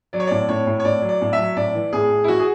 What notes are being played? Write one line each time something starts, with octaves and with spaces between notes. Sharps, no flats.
F#3 D5
C#5
A2 D5
A2 C#5
A2
C#5
A2 D5
F#3
D5
A2
E5
F#3
A2 D5
E3
A2 G#4
A2
E4
E3 F#4
G#4